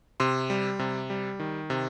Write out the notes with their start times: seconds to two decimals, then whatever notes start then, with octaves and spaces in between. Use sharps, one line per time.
0.20 C3 C6
0.50 G3
0.79 C3
1.10 G3
1.40 D#3
1.70 C3